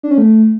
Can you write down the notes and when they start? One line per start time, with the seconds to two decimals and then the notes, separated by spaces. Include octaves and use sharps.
0.03 D4
0.11 C#4
0.18 A3